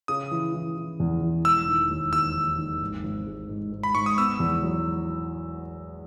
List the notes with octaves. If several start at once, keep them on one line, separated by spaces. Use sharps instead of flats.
C#3 D#6
E3
E3
E3
E2
E3
E1 E6
D#3
D#2
D#2 E6
D#3
D#3
G#1
G#1
G#3
G#2
G#2
B5
G#2 C#6
D#6
B3 E6
E2
F#3